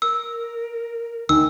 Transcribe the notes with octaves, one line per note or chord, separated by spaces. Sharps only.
A#4 E6
D2 D#3 G#5 E6